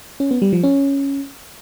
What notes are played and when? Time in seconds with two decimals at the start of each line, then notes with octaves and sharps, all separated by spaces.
0.20 C#4
0.31 B3
0.42 G3
0.53 F3
0.64 C#4